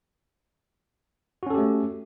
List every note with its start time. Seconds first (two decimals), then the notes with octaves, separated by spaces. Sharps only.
1.43 F#4
1.46 C#4
1.50 A4
1.54 G4
1.58 A3